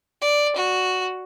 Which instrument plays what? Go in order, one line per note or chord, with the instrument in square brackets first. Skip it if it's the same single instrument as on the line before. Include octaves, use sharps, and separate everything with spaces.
[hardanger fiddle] D5
F#4